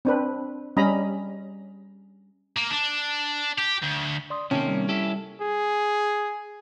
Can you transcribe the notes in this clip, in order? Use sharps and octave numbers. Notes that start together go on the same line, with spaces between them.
C4 D4 B4
G3 C#4 D#5 A#5 B5
A#3
D4
G4
D2
D5 C6 D#6
C3 D#3 A#3 C#4 G5 A5
G3
E4 G4 A4
G#4